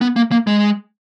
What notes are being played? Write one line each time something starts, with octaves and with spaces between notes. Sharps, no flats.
B3
A#3
A#3
G#3